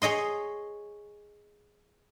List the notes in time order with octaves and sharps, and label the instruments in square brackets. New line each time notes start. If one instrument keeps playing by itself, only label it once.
[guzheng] G#4 C#5 D#5 C6